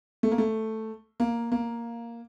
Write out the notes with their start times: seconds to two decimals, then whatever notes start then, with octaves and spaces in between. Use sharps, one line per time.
0.23 A3
0.31 A#3
0.38 A3
1.20 A#3
1.52 A#3